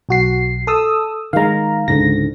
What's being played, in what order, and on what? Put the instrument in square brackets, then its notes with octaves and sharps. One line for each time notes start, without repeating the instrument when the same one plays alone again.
[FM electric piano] B1 F#4 C7
A4 D#6 E6
[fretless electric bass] D#3 G#3 [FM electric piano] F5 A#5
[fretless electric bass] C#2 G#2 D3 [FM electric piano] A#6